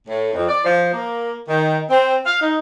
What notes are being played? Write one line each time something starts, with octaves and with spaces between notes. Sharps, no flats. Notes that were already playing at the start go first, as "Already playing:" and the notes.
A2
F2
D5
F3
A#3
D#3
C4
F5
D#4